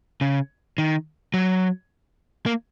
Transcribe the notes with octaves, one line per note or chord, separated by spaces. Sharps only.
C#3
D#3
F#3
A#3